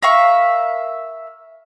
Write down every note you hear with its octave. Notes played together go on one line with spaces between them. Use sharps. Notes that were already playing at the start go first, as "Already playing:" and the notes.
A#4 E5 F5 C#6